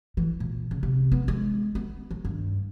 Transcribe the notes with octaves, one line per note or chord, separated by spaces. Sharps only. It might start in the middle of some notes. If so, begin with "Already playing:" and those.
E3
A#2
C#3
C3
B3
G#3
B3
D#3
G2